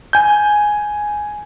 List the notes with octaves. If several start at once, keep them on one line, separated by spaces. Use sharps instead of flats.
G#5 G6